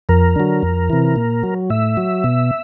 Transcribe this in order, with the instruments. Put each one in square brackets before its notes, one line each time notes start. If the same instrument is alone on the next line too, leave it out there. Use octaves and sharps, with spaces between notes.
[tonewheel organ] F2 A#4
D3 F#3
F2
C3 E3
A#2
F#3
A2 E5
F#3
B2